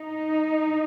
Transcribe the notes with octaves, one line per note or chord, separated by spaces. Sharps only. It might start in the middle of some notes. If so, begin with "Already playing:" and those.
Already playing: D#4